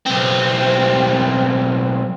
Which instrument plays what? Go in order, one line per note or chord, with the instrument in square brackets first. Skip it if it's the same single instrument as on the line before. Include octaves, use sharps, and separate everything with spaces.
[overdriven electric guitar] B1 C4